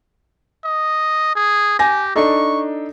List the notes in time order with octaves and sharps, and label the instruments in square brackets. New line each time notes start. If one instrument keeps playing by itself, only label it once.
[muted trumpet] D#5
G#4
[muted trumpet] G4 [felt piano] G#5 A#6
[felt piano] D4 D#4 A4 [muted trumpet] C#6